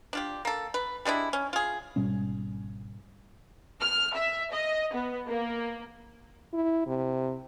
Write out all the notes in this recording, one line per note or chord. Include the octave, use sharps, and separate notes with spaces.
D4 F4 G4
A#3 A4
B4
G3 G#3 D4 E4
C#4
F4 G#4
G#1 B2 G3 C#4
F6
E5
D#5
B3
A#3
E4
C3